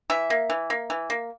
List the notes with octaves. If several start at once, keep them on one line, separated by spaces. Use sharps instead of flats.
E3 E5
A#3
E3
A#3
E3
A#3